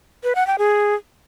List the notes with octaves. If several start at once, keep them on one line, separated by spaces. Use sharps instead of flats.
B4
F#5
G5
G#4